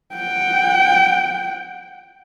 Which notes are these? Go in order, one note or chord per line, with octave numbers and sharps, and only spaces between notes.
F#5 G5